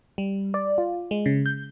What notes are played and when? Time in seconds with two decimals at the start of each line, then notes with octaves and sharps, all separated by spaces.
0.18 G3
0.54 D5
0.78 F4
1.11 G#3
1.26 C#3
1.46 G6